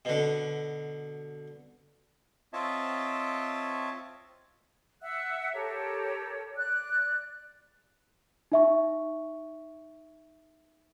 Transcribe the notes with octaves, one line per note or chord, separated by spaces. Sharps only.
B2 D3
C4 F4 C#5 D#5 E5 A5
E5 F#5 E6 F#6
G4 A4 A#4 C#5
D5 F#6
D#4 E5 C#6